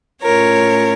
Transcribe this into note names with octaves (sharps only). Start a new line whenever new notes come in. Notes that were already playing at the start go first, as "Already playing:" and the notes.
A2 A3 C#4 F4 A#4 C#5